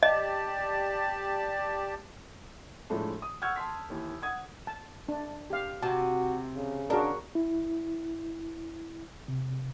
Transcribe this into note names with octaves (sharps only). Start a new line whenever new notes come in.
G4 D5 D#5 A5
A2 F3 G#3 A3 D4
D#6
F#5 C#6 E6 F6 G6 G#6
A5 C6 B6
D#2 E3
F#5 D#6 G#6
A5
D4
G4 F5
C3 F#4 A5
C#3
D4 F#4 G#4 A#4
E4
C3